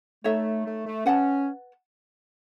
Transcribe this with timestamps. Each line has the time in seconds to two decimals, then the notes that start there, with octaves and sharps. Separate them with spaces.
0.24 A3 D#4 A4 C#5 E5
0.65 A3
0.86 A3
1.06 C#4 B4 F#5 A5